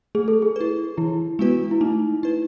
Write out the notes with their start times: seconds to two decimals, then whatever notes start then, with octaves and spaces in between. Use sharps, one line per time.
0.15 A3 G#4
0.28 A4
0.42 G#4
0.56 E4 B4
0.97 E3 E4
1.39 G#3 B3 F#4 B4
1.71 E4
1.81 A3 D#4
2.23 E4 B4